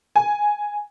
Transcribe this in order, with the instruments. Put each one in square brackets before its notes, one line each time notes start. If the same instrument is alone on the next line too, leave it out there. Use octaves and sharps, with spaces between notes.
[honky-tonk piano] G#5